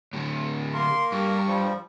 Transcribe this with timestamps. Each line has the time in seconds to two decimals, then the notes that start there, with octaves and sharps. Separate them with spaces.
0.13 A2 D3
0.74 A#3 A#4 C6
1.12 G2 C#6
1.48 F3 G3